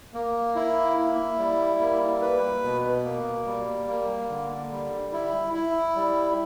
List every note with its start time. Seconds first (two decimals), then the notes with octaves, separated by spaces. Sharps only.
0.14 A#3
0.56 E4
0.97 E4
1.38 G3
1.80 A#3
2.22 B4
2.63 B2
3.05 A#3
3.46 G3
3.88 A#3
4.30 D3
4.71 G3
5.13 E4
5.54 E4
5.96 G3